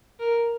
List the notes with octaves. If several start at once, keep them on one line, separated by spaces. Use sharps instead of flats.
A#4